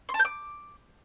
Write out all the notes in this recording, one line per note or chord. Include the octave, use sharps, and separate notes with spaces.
C6
A5
G6
D6